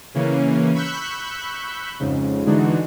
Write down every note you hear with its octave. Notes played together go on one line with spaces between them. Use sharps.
C#3 E3 A#3 C#4
B5 C#6 E6 F#6 G6 B6
F2 G#2 C#3
D3 E3 G#3 D4 D#4 F#4